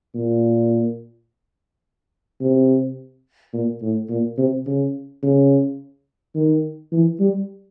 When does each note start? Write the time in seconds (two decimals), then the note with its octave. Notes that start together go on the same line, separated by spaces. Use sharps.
0.14 A#2
2.41 C3
3.53 A#2
3.81 A2
4.09 A#2
4.38 C3
4.67 C#3
5.23 C#3
6.35 D#3
6.92 E3
7.20 G3